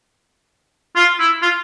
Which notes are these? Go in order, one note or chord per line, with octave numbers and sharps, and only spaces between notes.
F4
E4
F4